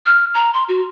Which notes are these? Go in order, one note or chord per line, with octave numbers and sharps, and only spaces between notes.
F6
A#5
C6
F#4